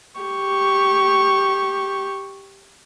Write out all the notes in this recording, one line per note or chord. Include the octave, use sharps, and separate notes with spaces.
G4 C#6